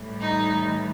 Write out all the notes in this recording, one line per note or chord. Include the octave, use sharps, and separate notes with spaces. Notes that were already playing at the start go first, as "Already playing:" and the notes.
Already playing: A2 E3 G3
D#4